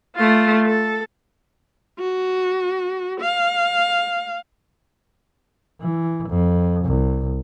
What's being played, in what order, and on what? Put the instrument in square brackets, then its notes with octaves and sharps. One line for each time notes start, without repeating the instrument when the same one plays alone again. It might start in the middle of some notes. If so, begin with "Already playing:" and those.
[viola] A3 F4
A4
F#4
F5
[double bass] E3
F2
C2